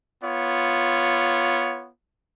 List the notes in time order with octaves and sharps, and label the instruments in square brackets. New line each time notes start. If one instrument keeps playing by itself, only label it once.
[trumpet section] B3 F4 C#5